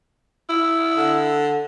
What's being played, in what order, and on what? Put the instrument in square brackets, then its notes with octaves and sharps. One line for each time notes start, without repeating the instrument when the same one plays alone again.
[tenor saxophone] E4
[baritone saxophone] D3